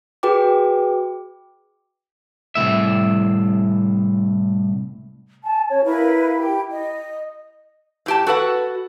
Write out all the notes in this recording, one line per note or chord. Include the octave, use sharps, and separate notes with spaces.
F#4 G#4 B4 G5 D6
C2 F#2 A2 E5
G#5 A5
C#4 C#5
E4 A#4 B4 F5
G4 G5
D#5
A2 G4 A5
F#4 A4 B4 F#5